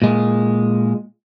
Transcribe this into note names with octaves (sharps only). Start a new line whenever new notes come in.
A#2 G#3